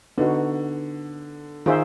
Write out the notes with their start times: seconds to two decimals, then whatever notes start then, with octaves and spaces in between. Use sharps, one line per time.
0.18 D3 B3 D#4 F#4
1.66 D#3 F4 G#4 C5 E5